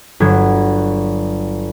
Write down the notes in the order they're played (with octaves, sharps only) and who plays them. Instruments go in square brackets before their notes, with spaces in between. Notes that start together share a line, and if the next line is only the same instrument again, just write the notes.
[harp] G1 F#3 G#6